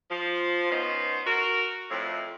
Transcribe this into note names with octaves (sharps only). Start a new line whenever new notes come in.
F3
B3 C#4 D#4 C5
F#4 A#4
F2 A2